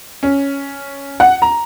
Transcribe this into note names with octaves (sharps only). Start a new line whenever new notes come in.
C#4
F#5
A#5